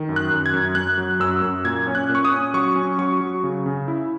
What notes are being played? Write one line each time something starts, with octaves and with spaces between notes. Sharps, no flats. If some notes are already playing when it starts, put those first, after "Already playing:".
Already playing: D#3
F#2
F#6
F#2
G#6
F#2
F#2 F#6
F#3
F#2 E6
F#2
A#2 G#6
C#4
F#6
A#2
C#6
D#6
C#4
F#3 C#6
C#4
F#3 C#6
F#3
C#3
C#3
E4